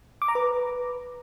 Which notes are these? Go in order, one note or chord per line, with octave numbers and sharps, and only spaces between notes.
D6
A#5
B4